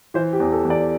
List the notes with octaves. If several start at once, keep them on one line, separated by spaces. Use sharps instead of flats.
E3 C5
G4
E2
A4
E2
D5